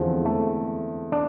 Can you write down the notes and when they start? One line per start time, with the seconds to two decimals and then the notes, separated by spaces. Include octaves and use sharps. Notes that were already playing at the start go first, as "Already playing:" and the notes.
Already playing: E2 D3 F3 G#3 C4 E4
0.25 A3
1.12 D4